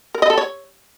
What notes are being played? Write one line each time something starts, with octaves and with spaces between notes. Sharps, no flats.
A#4
D#5
A4
C#5